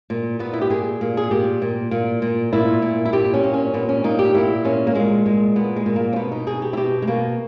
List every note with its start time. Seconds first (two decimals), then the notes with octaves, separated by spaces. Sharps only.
0.10 A#2
0.39 A#2 B3
0.53 E4
0.61 G4
0.70 A#2 G#4
1.01 A#2
1.17 G#4
1.31 A#2 G4
1.62 A#2
1.91 A#2
2.22 A#2
2.53 A#2 E4
2.82 A#2
3.05 E4
3.13 A#2 G4
3.34 C#4
3.43 A#2
3.54 C#4
3.74 A#2 B3
3.89 C#4
4.04 A#2 D#4
4.19 G4
4.34 A#2 E4
4.65 A#2 C#4
4.87 A#3
4.95 A#2 G#3
5.26 A#2 G#3
5.56 A#2 B3
5.76 G#3
5.86 A#2
5.96 A#3
6.13 C#4
6.16 B2 B3
6.32 D#4
6.47 B2 G#4
6.62 G4
6.73 E4
6.77 B2 G4
7.02 G#3
7.07 B2 A#3